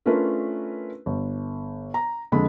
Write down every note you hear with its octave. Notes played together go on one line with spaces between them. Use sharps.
A3 C#4 D4 F4 A#4 B4
G1
A#5
F2 D3 G#3 A4 B5